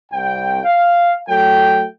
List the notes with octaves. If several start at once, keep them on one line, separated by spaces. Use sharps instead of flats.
C2 G5
F5
F#3 A3 A4 G5